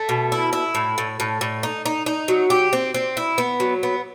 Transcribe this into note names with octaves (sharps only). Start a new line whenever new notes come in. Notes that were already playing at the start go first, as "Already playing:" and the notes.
Already playing: A3
B2
E4
E4
A2
A2
A2
A2
D#4
D#4
D#4
F#3
G4
C4
C4
E4
B3
F#3
B3